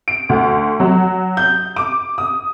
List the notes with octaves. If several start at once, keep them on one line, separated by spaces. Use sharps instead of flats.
D7
D2
F#3
G6
D6
D#6